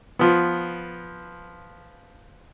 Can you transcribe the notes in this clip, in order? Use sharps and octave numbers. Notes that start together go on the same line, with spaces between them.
F3 B3